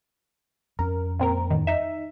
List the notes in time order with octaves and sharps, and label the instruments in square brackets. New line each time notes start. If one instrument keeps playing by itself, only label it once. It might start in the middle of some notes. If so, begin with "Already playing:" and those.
[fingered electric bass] F2 C#4 [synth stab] A#4
[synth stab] A#2 C4 A#4
E2 A2 D#3
D#4 E5